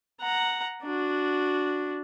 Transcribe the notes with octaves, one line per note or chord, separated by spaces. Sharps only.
F#5 A#5
D4 F#4